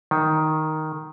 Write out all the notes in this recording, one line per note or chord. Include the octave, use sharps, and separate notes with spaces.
D#3